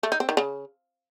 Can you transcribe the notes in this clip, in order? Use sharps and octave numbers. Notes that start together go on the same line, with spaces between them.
A3
D#4
C4
D#3
C#3